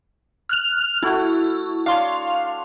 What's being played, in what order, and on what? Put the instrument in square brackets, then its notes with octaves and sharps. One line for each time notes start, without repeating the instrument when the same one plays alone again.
[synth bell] F6 F#6 F7
[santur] A3 F#4 A4 [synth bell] E4
[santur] D4 C#5 [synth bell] F5 C6